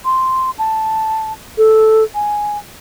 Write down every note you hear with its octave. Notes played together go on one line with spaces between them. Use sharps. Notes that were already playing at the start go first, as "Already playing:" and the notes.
C6
A5
A4
G#5